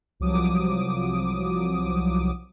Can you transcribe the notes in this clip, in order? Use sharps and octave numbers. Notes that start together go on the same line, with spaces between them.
C2 F3 F#3 D6 D#6